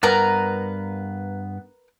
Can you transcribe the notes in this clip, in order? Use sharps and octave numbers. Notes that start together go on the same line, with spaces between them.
G2 B3 A#4 B4 A#5